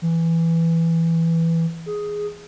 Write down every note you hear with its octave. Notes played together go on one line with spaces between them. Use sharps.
E3
G#4